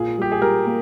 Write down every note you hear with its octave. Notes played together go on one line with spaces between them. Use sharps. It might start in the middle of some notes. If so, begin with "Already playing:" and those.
Already playing: A#2 A#3 F4 G#4
G3 G4
G#4
G3 A#4
A#3